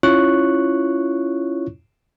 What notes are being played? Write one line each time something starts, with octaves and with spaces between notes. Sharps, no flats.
C#4 E4 F4 C#5 C#6 F#6